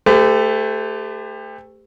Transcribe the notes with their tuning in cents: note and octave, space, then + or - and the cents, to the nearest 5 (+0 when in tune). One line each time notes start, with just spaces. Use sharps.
A3 +0 G4 +30 C5 -40